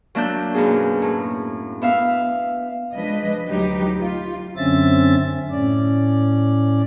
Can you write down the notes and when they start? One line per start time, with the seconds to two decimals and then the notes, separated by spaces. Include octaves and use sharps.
0.15 F#3 A#3 D4 E5 F#6 G6
0.54 F#2 B2 A#3 G#4
1.02 A2
1.82 B3 E5 F5
2.94 F3 G#3 D4 B4 D#5
3.48 D2 F#3 D#4 G4 B4
4.00 F4
4.57 F#2 D3 C4 C#4 E5 A6
5.51 A2 C#4 D5